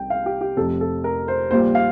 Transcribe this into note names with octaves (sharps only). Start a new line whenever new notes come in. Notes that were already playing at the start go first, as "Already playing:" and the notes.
Already playing: C2 C3 G3 G5
F5
G4
G4
F1 F2 C3 A4
A4
A#4
C5
A#1 A#2 G3 C5
F5